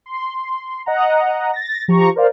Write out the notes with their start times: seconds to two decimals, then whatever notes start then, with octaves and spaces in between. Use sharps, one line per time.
0.06 C6
0.86 D#5 F#5 A#5
1.53 A6 A#6
1.88 F3 G4 A#5 C#6
2.16 A#4 C5 D5 F5